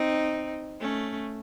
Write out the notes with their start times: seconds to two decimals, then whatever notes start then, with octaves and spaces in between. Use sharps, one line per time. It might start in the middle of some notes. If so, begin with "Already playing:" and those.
Already playing: C4 D#4
0.80 A3 C#4